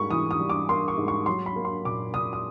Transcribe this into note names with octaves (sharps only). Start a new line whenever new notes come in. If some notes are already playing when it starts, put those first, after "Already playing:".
Already playing: G#2 G3 A#3 B5 C#6
E3 D#6
D#6
G3
D6
A#3 C6
C#6
G#2
C#6
F#3 C6
B5
A#3
C6
A#2 D6
A#2 D#6
D#6